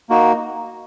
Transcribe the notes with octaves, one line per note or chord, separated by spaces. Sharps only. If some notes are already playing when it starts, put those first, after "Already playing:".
A#3 D#4 F#4